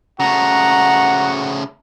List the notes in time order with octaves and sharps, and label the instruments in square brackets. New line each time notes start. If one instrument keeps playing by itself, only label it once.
[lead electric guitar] C#3 A3 [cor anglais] F#4 [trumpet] F#5 [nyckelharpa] A#5